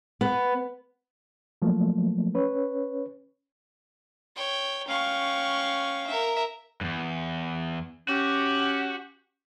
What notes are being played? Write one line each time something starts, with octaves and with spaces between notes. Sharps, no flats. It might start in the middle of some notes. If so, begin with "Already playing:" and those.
B3
F3 F#3 A3 A#3
C#4 B4 C#5
C#5 G5
C#4 F5 G5 C#6
A#4 E5
E2 G2
C#4 F#4 G4